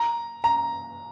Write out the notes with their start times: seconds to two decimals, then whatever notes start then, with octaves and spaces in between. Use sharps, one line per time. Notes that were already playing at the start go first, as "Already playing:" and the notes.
Already playing: A#5
0.44 A#5